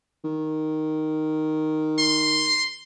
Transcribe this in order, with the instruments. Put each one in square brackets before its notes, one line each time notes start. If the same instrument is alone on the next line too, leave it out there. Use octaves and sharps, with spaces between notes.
[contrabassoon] D#3
[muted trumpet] C6